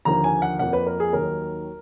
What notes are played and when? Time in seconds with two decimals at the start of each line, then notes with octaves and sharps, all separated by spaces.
0.05 D#2 D3 F3 A#3 A#5
0.24 G#5
0.42 F#5
0.59 F2 F3 A#3 F#5
0.73 B4
0.86 A#4
1.00 G#4
1.13 D#2 D#3 F#3 A#4